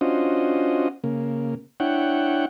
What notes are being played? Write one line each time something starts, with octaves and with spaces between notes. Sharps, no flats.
C#4 D4 F4 F#4 C5 D#5
C#3 A#3
D4 E4 C#5 F#5 G5